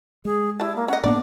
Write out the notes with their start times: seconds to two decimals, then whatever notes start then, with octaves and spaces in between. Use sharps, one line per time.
0.25 G#3 G#4
0.60 G3 E4 A5
0.76 A#3
0.88 C#4 D#5 F#5
1.04 A2 A#3 B3 D4 D5